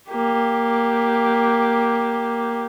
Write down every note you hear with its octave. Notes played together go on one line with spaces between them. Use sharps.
A#3 G4